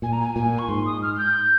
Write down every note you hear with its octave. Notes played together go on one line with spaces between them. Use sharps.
A#2 G#5
A#5
G#5
A#2 G#5
C#6
G#2 C6
D#6
F6
F6
G6